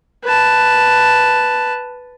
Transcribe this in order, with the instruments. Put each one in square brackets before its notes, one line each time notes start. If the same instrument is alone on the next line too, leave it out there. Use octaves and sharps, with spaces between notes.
[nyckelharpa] B4 A5